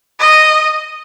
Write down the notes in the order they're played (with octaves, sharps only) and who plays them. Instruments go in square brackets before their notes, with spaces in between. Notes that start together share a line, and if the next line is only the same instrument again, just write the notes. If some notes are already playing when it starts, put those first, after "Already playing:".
[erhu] D#5